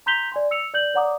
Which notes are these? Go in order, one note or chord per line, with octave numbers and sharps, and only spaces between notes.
A#5 C6 G6 B6 F7 G7
D5 G#5 C6
E6 C#7 F7
D5 G6 F#7
C#5 D5 F#5 A#5 D6 D#6